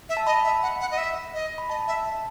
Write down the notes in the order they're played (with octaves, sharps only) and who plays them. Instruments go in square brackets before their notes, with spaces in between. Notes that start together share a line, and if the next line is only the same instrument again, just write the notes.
[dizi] E5
[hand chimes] A5
[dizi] D#5 [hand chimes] B5
[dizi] E5
F#5
F#5
D#5
E5
D#5
[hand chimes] B5
[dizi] D#5 [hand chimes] A5
[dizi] E5
E5